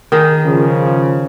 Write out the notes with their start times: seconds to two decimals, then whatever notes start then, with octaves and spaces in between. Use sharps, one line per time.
0.12 D#3 G#4
0.44 C#3 F3